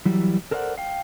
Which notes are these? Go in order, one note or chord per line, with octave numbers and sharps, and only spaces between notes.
E3 F#3 G3
A4 A#4 C5 D5 F5 F#5
F5 G5